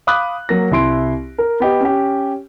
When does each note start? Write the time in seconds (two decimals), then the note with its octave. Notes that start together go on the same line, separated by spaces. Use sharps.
0.07 F5 B5 D6 D#6 F#6
0.49 F#3 A#3 A#6
0.71 C2 E4 C6 D7
1.38 A#4
1.60 B3 G4 D#5
1.81 C#4 G4